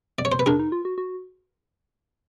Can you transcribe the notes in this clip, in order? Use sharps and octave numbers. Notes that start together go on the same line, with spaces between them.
D5
C#5
C5
B4
D4 G#4 A#4
D#4
F4
F#4
F#4